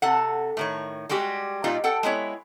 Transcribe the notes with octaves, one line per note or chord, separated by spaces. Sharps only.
C3 A4 F#5
A2 D#3 C#5
G3 G#3 F#4 G4
A#2 G3 D#4 F4
A4 F#5 G5
G#3 B3 E4 C#5